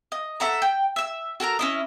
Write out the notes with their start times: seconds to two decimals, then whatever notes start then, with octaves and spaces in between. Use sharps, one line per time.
0.12 D#5
0.40 A4 E5 F#5 A#5
0.62 G5
0.96 E5 E6
1.40 F#4 A4 A#4 A#5
1.59 C#4 E4 D#5